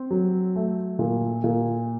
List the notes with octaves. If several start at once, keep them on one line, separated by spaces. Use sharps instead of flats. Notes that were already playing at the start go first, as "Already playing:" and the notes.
Already playing: C4
F#3
A3
A#2
A#2